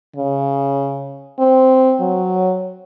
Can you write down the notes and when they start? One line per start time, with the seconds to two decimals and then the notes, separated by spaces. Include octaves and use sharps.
0.16 C#3
1.39 C4
2.01 F#3